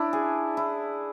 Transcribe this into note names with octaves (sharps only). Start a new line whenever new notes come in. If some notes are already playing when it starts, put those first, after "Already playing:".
Already playing: D4 E4
G#4
E4